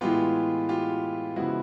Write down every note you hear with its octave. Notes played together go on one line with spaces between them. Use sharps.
A2 E3 G#3 B3 F4 G4
F4 G4
C#3 F3 G#3 B3 E4 F#4